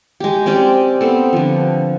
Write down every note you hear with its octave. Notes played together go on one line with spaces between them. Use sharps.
G#3 G4
C4 C#4 G4 D5
B3 C4 A4
D3 F3